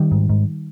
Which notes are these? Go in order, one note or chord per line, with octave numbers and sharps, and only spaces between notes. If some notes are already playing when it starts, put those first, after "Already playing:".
Already playing: D#3 G3
G#2
G#2